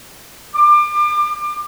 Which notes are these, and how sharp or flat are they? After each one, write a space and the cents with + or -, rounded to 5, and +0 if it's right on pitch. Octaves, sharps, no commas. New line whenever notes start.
D6 +30